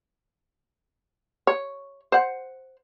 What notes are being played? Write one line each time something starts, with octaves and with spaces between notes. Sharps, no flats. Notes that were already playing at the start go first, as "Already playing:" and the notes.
C#5
C5 F#5